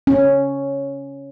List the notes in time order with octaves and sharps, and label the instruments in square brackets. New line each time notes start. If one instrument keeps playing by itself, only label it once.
[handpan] C#4